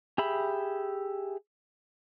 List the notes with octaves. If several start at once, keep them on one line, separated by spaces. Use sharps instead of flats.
G4 G#4 E5 B5